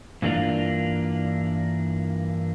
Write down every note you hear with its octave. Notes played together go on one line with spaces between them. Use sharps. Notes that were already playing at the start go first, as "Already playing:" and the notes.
G2 E3 A#3 D4 F4